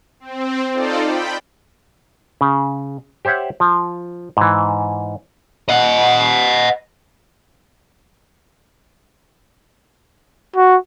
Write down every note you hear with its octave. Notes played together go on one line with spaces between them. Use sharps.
C4
D#4 F4 A4 C5 D5
G5 B5
C#3
G4 C5 C#5 E5 F#5
F3
G#2 E3
D#5 F#5
F#4